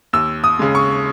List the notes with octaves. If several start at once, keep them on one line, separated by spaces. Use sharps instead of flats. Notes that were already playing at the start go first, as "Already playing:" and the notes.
D#2 E6
D#6
C#3 G#3
C#6